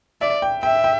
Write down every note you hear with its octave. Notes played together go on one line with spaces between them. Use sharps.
D5 E5
G5
E5 G5
G5